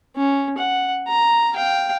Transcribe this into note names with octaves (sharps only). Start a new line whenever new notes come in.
C#4
F#5
A#5
F5 G5